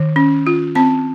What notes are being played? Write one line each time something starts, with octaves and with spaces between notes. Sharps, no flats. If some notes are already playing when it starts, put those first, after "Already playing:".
Already playing: D#3
C#4
F4
C4 A5